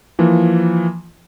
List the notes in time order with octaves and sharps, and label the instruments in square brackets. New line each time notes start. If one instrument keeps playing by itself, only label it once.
[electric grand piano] E3 F3 A#3